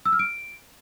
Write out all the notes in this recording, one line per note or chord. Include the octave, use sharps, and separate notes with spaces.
E6
F6
D7